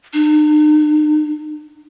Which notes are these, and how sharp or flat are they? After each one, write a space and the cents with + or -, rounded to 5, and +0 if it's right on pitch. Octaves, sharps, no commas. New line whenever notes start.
D#4 -45